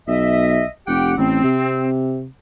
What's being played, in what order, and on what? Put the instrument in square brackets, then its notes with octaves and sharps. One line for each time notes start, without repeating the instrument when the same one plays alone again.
[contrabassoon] B1 [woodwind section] D#5 E5
[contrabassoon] F1 [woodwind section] G4 F#5 G5
[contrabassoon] A1 [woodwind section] C4
[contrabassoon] C3